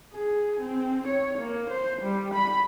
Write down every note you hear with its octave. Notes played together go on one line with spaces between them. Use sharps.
G#4
C4
C#5
A#3
C5
G3
B5